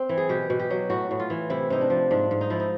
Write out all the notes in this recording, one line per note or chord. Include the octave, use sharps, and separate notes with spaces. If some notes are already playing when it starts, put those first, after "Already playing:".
Already playing: C4
E3
G#4
B2 G4
B2
G4
F#3
A2 F#4
A2
F4
E3
C3 E4
C3 D#4
D4
F3
G#2 D4
G#2
D#4
F3 E4
D#4